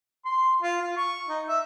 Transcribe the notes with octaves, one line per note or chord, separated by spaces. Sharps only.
C6
F4
F4
C#6
D#4
E5